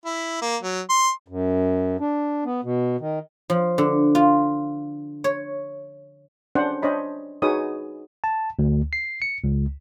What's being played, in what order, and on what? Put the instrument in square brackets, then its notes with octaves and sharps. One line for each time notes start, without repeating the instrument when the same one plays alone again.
[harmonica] E4
A#3
F#3
C6
[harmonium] F#2
D4
B3
B2
D#3
[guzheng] F3
D3
F4
C#5
[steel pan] C#4 D4 C5 F#5
D4 C5 C#5 D#5 B5
D#4 F#4 G#4 B4 C#5 D#6
[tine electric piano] A5
D2
C7
C#7
C#2